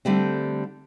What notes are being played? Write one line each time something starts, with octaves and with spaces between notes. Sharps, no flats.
D3 G3 A3 C4